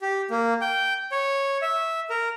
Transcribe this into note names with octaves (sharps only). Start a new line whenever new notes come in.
G4
A#3
G5
C#5
E5
A#4